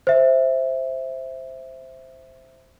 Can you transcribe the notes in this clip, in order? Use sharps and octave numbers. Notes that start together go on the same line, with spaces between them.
C5 E5